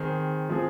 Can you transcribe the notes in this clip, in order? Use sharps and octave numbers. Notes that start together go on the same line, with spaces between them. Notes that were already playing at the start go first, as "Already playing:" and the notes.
Already playing: D#3 C4 G#4
F3 G#3 C4 G#4